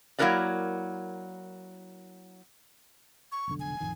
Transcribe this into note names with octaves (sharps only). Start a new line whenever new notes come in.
F#3 A#3 E4 A#4 B4 D5
C#6
F1 B1 D3
G#5
A1 F2 D#3